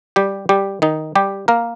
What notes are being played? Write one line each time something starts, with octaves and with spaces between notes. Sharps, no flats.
G3 G4
G3 G4
D#3 D#4
G3 G4
A#3 A#4